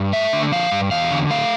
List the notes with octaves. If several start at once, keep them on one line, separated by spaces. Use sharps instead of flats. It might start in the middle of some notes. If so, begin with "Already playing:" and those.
Already playing: G2
A3 E5
D3
F3 F5
G2
E2 F5
D3
A3 F5